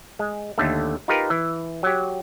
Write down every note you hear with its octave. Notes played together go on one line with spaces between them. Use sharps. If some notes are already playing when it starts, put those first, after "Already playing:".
G#3
D#2 D3 A3
D#4 F4 G4 A#4 B4
E3
F#3 G4